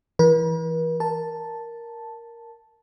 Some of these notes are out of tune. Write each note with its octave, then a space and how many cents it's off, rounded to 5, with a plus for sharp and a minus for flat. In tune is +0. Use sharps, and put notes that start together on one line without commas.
E3 +0 B4 -45
A#4 +0 A5 +0